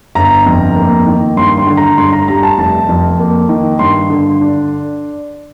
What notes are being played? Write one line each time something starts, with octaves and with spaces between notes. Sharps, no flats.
G1 A#5
F2
A#3
D#3
G2 C6
C6
D3
A#5
G2 C6
A#5
G3 A#5
A5
F1 A5
F2
A#3
D#3
G2 C6
D3
D4